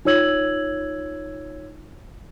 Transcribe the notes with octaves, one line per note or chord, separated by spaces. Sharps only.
D#4 F4 C#5 E6 G#6 F#7